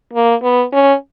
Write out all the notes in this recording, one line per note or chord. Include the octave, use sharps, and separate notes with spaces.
A#3
B3
C#4